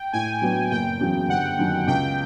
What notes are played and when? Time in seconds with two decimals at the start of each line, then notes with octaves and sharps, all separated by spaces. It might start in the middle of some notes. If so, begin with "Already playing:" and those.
Already playing: G5
0.12 A2 G#5
0.42 F#3 B3 D4
0.71 F#1 G5
1.00 E2 C#3 F#3
1.29 G1 F#5
1.59 F#2 D#3
1.87 C#2 G5